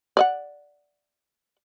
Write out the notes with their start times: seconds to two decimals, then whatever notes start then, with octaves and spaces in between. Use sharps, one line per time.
0.17 D5 D#5 F#5